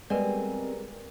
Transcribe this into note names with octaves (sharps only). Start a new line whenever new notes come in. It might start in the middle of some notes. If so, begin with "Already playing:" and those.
G3 G#3 B3 C4 A#4 B4 D5 G#5